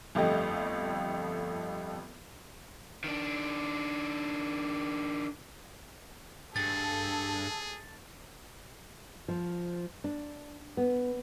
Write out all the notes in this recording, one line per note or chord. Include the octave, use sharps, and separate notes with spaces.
G1 F2 A3 G4 D#5
D#3 D4
G2 G#4 A4 A6
F3
D4
B3